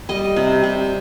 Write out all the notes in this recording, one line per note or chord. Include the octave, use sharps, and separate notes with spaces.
G3 D#5
C3
C3